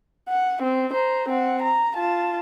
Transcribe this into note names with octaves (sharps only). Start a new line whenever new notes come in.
F#5
C4
C5 A#5
C4 F#5
A#5
F4 A5